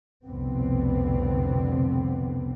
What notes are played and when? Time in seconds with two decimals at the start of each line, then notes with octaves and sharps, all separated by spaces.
0.24 F1 C2 B2 D3 B3 C4